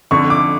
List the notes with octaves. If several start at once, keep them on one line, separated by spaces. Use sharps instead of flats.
F2 D3 C#6
D6